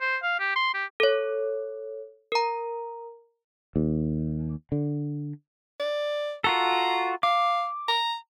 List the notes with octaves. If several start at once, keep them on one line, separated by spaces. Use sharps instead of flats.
C5
F5
G4
C6
G4
A4 C#5
A#4 A#5
D#2
D3
D5
F4 F#4 A4 A#5
F5 D6
A#5